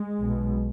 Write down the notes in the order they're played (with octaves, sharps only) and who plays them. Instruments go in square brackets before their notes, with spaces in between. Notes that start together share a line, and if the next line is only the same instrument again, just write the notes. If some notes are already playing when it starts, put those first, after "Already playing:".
Already playing: [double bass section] G#3
B1 B2